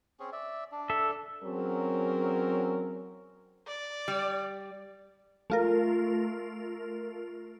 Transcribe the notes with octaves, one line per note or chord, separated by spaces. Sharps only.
C4 C#4 G#4
D5 E5
D4
A4 E5
E2 F#3 C4 C#4 G#4 A#4
D5
G3
A3 F4 A#4